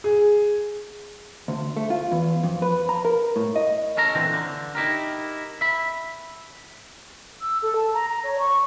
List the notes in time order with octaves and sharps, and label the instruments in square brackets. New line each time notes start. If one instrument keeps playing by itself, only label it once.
[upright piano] G#4
[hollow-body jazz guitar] D2
A3
F4
E2
F2
B4
A#5
A#4
A2
D#5
[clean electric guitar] C#4 A4 A#4 A#5
A#2 D3 E3 C4
D3
D#4 E4 G4 A#4
E5 B5
[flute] E6
A4
A5
A#5
A#5
C#5
C#6